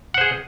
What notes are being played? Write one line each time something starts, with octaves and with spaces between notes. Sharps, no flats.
G#4 C5 F#5